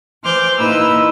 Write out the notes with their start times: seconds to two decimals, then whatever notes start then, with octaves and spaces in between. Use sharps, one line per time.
0.22 E3 C5 D6 F6 G6
0.57 A#2 A#3 D#4 E4 B4 E6